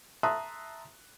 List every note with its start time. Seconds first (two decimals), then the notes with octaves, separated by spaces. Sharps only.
0.23 E5 A5 A#5 C6 D#6 F#6